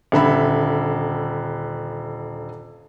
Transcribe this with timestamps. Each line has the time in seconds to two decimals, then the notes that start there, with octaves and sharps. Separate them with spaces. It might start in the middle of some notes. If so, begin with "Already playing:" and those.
0.12 D#1 D3 E5 B5